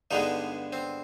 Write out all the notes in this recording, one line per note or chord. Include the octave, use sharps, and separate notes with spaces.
G2 D3 G#3 B3 D#4
C4